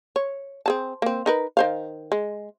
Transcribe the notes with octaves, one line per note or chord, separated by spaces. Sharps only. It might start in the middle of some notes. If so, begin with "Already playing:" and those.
C#5
C4 G#4 A5
A#3 C4
D#4 A#4 B4
D#3 C5 F5
G#3